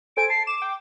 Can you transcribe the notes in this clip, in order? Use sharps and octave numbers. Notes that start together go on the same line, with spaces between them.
A4 C5 G#5 D7
A5 C7
D6 E7
G5